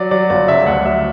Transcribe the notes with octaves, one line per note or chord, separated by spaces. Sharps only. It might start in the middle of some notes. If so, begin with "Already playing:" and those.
Already playing: F#3 D5
F#3 D5
G1 D5
C#3 E5
D2 F#5
F#3 E5